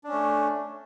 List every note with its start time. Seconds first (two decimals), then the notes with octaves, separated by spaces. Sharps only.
0.04 D4
0.08 C#4
0.13 A3